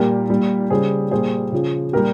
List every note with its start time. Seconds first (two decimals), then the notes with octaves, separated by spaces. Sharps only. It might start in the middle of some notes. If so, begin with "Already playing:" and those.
Already playing: A#2 G3 G4 A#4
0.30 A#2 G3
0.70 C#3 G3 G#4 C5
1.11 A#2 G3 G#4 C5
1.52 C#3 F3
1.93 A#2 G3 G4 A#4